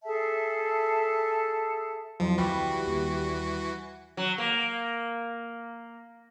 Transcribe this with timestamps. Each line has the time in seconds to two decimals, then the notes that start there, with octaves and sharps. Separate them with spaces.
0.04 G#4 A4 E5 A5
2.20 F2 F3 F#3 E4
2.38 D2 E3 G3 F#4 B5
2.87 D#2
4.17 F#3
4.38 A#3